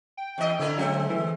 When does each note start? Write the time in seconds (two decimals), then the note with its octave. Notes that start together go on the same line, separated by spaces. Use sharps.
0.17 G5
0.38 E2 D#5
0.59 D3 C4 E4 A#4
0.78 F#3 G#3 C4
1.10 E3